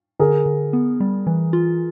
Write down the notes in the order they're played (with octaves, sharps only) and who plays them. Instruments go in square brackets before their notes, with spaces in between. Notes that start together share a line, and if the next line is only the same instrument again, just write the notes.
[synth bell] D3 [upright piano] G#4 A#4
[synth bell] D3
B3
G3
E3
F4